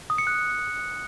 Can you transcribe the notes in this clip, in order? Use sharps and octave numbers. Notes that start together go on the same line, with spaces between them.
D#6
C#7
F#6